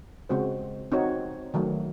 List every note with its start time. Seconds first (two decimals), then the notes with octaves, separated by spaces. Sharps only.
0.29 C#3 G#3 C4 F#4 C5
0.92 C4 D#4 F#4 C#5
1.54 D#3 F#3 A3